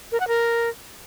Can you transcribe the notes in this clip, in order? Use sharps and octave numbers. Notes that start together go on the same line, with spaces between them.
A#4
F#5
A#4